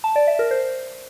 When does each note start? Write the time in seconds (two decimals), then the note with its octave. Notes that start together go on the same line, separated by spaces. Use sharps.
0.04 A5
0.16 D5
0.27 E5
0.39 A#4
0.51 C5